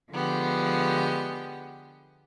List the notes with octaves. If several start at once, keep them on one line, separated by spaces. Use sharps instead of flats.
D3 F3 G#3 B3 G4